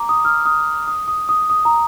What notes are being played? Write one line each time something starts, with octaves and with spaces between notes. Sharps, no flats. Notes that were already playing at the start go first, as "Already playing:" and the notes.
Already playing: A#5 D6
D#6
F6
D#6
D#6
D#6
D#6
D#6
A#5